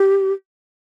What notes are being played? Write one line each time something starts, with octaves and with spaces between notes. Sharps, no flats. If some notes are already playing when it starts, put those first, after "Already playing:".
Already playing: G4